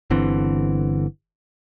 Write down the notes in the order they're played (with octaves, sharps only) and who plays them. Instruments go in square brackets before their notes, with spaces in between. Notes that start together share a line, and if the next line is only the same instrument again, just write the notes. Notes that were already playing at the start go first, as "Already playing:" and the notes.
[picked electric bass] G1 D3 E3 C4